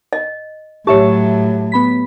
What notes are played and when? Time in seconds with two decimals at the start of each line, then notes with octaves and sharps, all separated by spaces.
0.13 D#5
0.87 A2 F#3 G4 C#5 E5 A5
1.72 B3 B5 B6